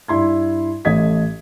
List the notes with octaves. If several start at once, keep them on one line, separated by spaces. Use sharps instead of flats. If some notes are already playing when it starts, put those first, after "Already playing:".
G2 E4 C6 G#6
A1 A3 D#5 D#6 G#6 B6